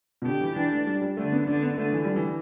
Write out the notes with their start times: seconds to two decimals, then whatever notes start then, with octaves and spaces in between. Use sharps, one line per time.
0.22 B2
0.26 D3 G4
0.41 E3
0.56 E3 D4
0.72 A3
0.87 G3
1.02 G3
1.17 D3 A3
1.32 B3
1.47 D3 D4
1.63 B3
1.77 D3 A3
1.93 E3
2.05 G3
2.16 E3